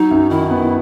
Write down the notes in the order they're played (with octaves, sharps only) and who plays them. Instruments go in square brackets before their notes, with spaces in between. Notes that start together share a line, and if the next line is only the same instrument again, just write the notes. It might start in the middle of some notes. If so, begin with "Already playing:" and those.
Already playing: [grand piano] F#3 [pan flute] D#4
[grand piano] F#2
[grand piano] D#3 [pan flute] E4
[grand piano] B3